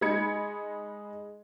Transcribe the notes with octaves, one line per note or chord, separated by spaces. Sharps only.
G#3 D#4 B5 G#6 C#7